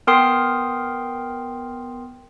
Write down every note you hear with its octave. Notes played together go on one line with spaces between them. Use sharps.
B3 A#4 G5 C6 D#6 C7